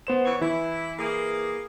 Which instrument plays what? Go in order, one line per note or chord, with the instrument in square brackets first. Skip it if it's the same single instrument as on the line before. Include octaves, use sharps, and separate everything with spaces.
[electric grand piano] B3 C5 E7
[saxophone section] E3 C#5
[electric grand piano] E3 [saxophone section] E4
[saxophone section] A#3 G#4